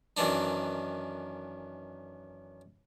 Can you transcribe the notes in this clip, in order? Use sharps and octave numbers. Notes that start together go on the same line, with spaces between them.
F#2 D#3 E3 D4 D#4